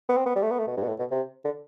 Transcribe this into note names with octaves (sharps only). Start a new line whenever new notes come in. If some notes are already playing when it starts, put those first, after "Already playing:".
B3
C4
B3
G3
A3
B3
A3
B2
G2
B2
A2
B2
C3
D3